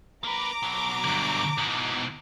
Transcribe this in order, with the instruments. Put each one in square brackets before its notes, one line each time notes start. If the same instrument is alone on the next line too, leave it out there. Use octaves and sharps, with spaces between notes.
[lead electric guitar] A#3 B4 [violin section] A#5 D6
[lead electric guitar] B2 F#3
[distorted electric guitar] G2 D3
[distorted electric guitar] G#2 E3 [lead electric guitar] B2